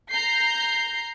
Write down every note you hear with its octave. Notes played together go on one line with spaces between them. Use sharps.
A#5 G6 C7